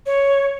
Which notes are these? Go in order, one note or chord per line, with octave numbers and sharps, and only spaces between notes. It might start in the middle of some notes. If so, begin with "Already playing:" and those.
C#5